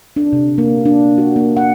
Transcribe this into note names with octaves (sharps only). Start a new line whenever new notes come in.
D4
C3
A#3
D4
F#4
A#3
F#5